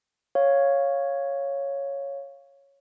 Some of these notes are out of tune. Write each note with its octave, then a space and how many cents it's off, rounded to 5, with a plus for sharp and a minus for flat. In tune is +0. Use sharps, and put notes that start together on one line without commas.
C#5 +0 F5 +0